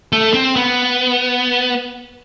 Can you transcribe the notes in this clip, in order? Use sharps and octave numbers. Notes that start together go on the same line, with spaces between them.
A3
C4
B3